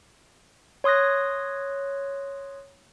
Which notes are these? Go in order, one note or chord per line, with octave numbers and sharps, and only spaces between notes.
C#5 C6 D#6 F#6 A#6